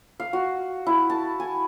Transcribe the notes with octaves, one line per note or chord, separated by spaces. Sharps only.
F5
F#4
E4
A5
G#5